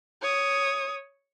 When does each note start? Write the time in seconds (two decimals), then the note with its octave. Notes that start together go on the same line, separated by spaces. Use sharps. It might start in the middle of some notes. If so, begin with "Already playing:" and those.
0.22 C#5 D#6